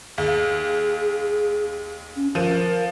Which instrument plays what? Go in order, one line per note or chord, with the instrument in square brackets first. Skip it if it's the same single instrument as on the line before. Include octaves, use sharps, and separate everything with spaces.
[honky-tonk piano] D#2 [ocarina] G#4
[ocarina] C#4
[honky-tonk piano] F3 D#7 [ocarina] A#4